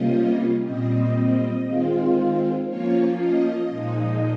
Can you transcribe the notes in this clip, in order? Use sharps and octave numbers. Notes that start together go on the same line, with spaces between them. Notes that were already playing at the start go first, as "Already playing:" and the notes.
Already playing: C3 G3 A#3 C#4 F4 D#5
A#2 G3 C4 D#5
D#3 G#3 C4 F4
F3 A#3 C#4 F4 C#5
D#5
A#2 F3 G#3 D#4